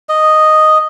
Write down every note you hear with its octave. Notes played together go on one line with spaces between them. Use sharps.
D#5